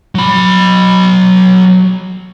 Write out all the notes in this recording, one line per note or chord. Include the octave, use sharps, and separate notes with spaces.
F#3 B5